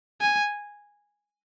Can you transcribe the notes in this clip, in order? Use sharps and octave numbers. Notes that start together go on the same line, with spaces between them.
G#5